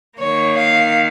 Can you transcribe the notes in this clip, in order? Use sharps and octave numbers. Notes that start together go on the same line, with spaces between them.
D#3 A#3 C#5
F5